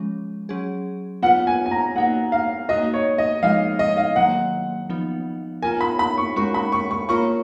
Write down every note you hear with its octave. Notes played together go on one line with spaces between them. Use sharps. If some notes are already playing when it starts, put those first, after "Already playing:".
Already playing: F3 G#3 C#4
F#3 C#4 G#4
B3 F4 B4 F#5
G#5
G#5
A#5
A#3 D#4 F#4 F#5
F5
A#3 D#4 F#4 D#5
C#5
D#5
F3 G#3 D#4 F5
D#5
F5
D#3 F#3 A#3 F#5
F3 B3 D#4
B3 F4 A#4 G#5
B5
B5
C#6
G#3 C#4 F#4 A#4 C#6
B5
C#6
C#6
A#3 F4 A#4 C#5 C#6